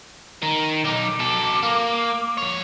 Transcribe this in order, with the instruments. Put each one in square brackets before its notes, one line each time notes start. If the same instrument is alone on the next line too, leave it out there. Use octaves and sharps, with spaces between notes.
[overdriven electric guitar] D#3 [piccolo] A#5
[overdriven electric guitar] B1 D#4 [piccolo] D6
[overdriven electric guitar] B2 A4
A#3
[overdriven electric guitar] F2 C#5 [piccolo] F7